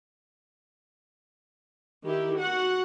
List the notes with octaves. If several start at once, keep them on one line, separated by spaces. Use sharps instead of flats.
D#3 E4 G4
F#4 F#5